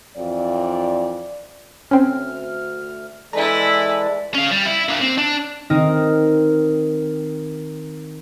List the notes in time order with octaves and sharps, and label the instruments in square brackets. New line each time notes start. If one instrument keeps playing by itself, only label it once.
[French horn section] F2 E3 F4 D5
[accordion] D2 F6 [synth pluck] C4 C#4
[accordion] E3 G#3 A4 [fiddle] E4 B4 [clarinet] D5 [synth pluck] A#5
[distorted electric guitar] C#4 F5
G3
E4
A#3 D4
C4
D4
[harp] D#3 C4 D#4 A#4